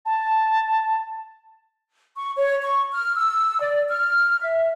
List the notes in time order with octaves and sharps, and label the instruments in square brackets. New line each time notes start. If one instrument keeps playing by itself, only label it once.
[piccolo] A5
[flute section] C#6
C#5
C#6
F6
E6
D5
F6
E5